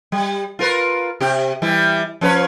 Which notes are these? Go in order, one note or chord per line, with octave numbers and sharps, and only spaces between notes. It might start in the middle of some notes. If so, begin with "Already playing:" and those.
G3
F4 A#4 B4
C3 G4
E3 G3 E4
F3 C#4 B4